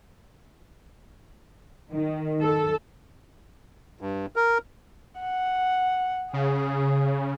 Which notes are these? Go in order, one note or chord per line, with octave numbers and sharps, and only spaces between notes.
D#3
A4
G2
A#4
F#5
C#3 G#4